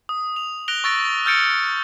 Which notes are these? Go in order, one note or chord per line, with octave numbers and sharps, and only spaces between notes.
D#6
F7
F#6 A#6 D7 F7 G7
C#6 E6 A6 A#6 D7
E6 F6 G6 A6 C#7 D7